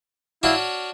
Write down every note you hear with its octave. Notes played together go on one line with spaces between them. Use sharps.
D4 E4 F#4 C#5 F5
F6